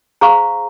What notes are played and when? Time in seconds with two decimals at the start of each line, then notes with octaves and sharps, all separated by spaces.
0.21 G#4 C5 F5 A#5 C#6